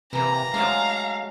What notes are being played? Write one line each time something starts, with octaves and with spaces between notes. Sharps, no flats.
C3 E3 A#3 A#5
F#3 G#3 A3 D4 F5